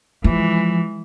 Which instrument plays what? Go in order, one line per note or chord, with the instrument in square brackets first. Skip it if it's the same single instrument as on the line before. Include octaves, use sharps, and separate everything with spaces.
[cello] E3 G#3 [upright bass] F3